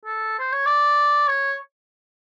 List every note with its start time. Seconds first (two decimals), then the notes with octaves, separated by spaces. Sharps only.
0.05 A4
0.39 C5
0.52 C#5
0.66 D5
1.28 C#5